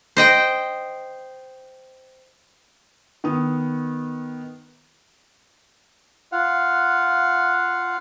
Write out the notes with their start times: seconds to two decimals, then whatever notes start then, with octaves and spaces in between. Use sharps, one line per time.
0.17 C5 D#5 G5
3.24 D#3 B3 D#6
6.32 F4 F5 F#5